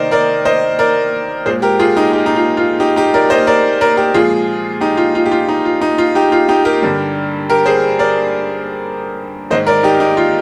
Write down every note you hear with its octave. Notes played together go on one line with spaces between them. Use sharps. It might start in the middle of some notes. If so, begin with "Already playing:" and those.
Already playing: C3 D#3 A#3 D#4 A#4 C5 D5 D#5
A#4 D5
C5 D#5
A#4 D5
A#2 G#3 G#4 C5
G4 A#4
F4 G#4
D#4 G4
D#4 G4
D#4
F4
F4
D#4 G4
D#4 G4
A#4 D5
C5 D#5
A#4 D5
A#4 D5
G4 A#4
A#2 F3 G#3 F4 G#4
D#4 G4
F4
F4
G4
F4
D#4
F4
D#4
F4
D#4 G4
F4
D#4 G4
G4 A#4
G2 D3 G3
G4 A#4
G#4 C5
A#4 D5
G#2 D#3 G#3 C5 D#5
A#4 D5
D#4 G4
D#4
F4